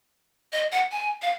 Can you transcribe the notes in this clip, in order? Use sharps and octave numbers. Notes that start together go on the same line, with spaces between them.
D#5
F#5
G#5
F5